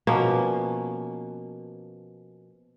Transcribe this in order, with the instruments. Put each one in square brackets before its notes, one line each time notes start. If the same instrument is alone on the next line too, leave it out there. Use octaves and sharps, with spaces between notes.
[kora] B2 F3 A#3 C#4